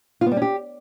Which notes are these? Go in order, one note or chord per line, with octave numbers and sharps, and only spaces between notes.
F4
B3
G3
C#4
G4